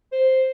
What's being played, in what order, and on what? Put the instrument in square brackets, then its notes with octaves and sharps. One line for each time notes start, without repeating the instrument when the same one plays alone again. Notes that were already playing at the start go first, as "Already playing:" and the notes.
[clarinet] C5